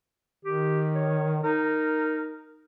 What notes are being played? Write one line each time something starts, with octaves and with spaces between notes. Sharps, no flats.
D#3 G4
C#5
D#4 A#4